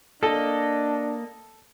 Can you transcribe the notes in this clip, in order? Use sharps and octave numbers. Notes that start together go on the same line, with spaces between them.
A#3 D4 A4 D#5